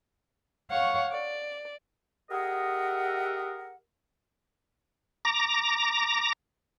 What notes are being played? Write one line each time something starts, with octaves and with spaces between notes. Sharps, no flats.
C#5 F5 F#5 C#6
D5
G4 G#4 A#4 D#5 E5 F#5
A#5 D6 A#6